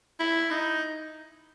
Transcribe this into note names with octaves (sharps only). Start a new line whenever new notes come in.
E4
D#4